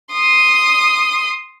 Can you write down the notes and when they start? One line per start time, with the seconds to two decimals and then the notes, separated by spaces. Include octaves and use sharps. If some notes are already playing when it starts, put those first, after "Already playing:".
0.13 C6 D#6